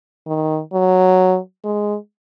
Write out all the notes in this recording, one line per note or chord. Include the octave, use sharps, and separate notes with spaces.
D#3
F#3
G#3